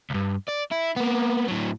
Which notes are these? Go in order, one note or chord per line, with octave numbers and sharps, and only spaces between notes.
C#2 G2
D5
E4
A#3 B3
A2 F#3